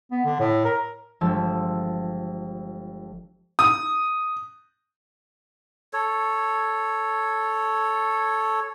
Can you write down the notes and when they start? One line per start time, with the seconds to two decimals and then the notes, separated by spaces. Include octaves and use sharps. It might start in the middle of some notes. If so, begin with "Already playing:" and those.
0.11 B3
0.25 D3
0.40 A2
0.65 A#4
1.21 G1 F3 G#3 A5 E6
3.59 D#6
5.93 A4 C#5